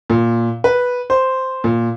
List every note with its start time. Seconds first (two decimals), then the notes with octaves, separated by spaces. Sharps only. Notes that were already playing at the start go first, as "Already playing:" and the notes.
0.10 A#2
0.64 B4
1.10 C5
1.64 A#2